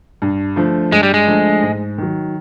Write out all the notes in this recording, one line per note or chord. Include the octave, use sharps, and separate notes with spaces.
G2
D3 F3 A3
G2 G#3
G3
G#3
D3 F3 A3
G#2
D#3 F#3